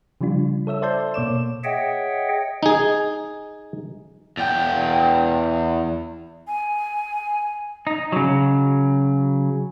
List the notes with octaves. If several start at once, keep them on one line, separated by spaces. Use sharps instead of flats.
C#3 F3 G3 D4 F4
A4 C#5 E5 E6
C5 D5 E5 A5 C6 G6
B2 A#3 C#5 D6 E7
G#4 C#5 D#5 E5 F#5 G5
D#4 G#4
E2 G5
G#5
D#4
C#3 F#3